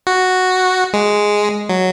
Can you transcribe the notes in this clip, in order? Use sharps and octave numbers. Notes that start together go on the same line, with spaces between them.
F#4
G#3
F#3